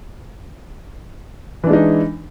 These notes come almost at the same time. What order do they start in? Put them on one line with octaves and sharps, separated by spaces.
E3 D4 G#3 D#4